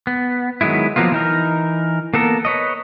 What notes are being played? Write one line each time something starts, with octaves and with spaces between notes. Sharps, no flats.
B3
D#3 F#3 G#3 B3 E4
F3 F#3 A#3 B3 F4
E3 D#4 A#4
A#3 B3 A4 A#4
B4 C#5 D#5